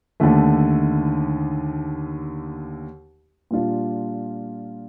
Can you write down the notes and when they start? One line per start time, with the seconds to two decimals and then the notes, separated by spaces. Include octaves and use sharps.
0.20 D#2 D3 A3
3.51 A#2 G3 D4 F4